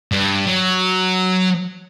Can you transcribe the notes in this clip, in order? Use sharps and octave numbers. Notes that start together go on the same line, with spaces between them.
G2
F#3